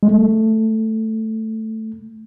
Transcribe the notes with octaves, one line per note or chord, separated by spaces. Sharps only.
G#3
A3